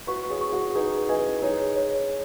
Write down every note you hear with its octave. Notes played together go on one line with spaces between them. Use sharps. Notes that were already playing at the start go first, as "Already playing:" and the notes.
F#4 B4 C#6
G#4 C#5
C#6
F#4 B4
D#4 G#4 B4
B4 D#5 G#5
D#4 G#4 C#5
C#5